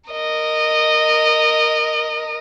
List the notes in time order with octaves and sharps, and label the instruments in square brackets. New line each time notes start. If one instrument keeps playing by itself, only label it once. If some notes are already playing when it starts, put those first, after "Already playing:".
[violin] A#4 D#5